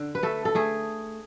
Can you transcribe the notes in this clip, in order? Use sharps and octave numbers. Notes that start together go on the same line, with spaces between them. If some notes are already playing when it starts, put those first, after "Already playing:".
Already playing: D3
B4
A3 A4
A4
A3 G#4